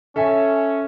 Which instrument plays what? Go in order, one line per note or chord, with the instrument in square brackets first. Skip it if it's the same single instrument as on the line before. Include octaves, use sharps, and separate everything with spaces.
[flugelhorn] C#4 [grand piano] A4 E5 G#5